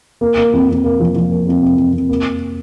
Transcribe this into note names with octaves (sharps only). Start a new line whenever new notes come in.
A#3
A#3
F2
F2
A#3
F3
F3
A#3
F2
C3
F2
F2
A#3